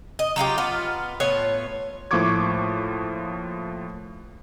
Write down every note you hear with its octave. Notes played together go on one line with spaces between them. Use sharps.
D#5
F#3 D#4 F4 G4
B3 F4
A2 B3 F4 C#5
A2 F3 A#3 C#6 D6 G#6